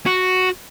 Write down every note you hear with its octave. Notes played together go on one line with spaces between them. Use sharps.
F#4